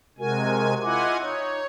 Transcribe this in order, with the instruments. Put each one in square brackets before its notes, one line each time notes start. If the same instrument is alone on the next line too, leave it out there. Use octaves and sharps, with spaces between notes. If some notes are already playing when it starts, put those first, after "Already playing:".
[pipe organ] C3 G#3 G#5 [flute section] F#4 A#4
[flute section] E4 D#5 D6 [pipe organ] F4 F#5 G#5
[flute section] D#4 [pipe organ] C#5